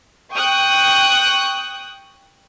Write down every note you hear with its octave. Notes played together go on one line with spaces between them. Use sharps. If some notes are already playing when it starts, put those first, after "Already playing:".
G5 C#6 D#6 F#6